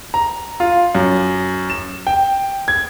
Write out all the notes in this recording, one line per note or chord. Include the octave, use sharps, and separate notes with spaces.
A#5
F4
F#2
E7
G5
G#6